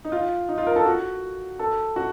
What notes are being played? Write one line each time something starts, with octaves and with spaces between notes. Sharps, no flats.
D#4
F4
D#4
F4
A#4
A4
F#4
A4
F#4